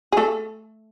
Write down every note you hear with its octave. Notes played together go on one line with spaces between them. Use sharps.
G#4
A3 A4